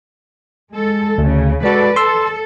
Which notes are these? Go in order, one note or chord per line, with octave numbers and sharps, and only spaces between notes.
G#3 A4
D2 C#3
G#3 F#4 A4 B4 D5
A4 C6 E6